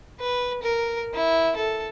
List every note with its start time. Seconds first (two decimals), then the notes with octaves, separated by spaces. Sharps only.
0.20 B4
0.63 A#4
1.14 E4
1.56 A4